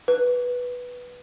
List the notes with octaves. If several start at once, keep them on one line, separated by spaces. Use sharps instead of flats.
B4